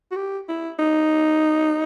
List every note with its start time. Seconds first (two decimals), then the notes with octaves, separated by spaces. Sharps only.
0.11 F#4
0.16 G4
0.49 E4
0.79 D#4